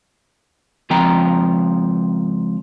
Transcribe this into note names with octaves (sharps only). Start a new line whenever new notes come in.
C#2 F3 C4 G5 A#5